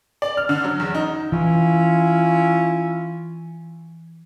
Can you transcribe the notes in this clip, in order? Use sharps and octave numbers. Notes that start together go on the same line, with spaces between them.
D5
F6
D3
F#3
E2
D#4
E3 C#4 E4 F4